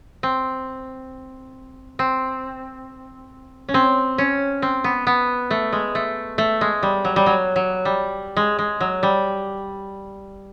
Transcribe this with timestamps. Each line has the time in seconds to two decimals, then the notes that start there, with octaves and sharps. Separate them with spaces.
0.23 C4
1.99 C4
3.69 C#4
3.74 C4
4.18 C#4
4.62 C4
4.84 B3
5.07 B3
5.51 A3
5.73 G#3
5.95 A3
6.38 A3
6.61 G#3
6.83 G3
7.05 F#3
7.16 G3
7.26 F#3
7.56 F#3
7.85 G3
8.37 G#3
8.59 G#3
8.81 F#3
9.03 G3